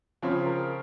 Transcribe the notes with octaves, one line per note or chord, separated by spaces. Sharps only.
C#3 F3 C4 C#5
A#4